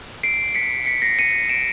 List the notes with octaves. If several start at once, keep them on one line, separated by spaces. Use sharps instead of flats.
C7 D7
B6 C#7
B6 C#7
A#6 C7
C#7 D#7
D7 E7